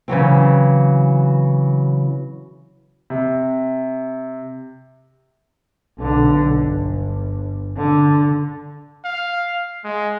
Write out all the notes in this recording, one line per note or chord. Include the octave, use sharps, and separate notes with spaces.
C#3 E3 F#3 C4
C3
B1 D3
G1
D3
F5
G#3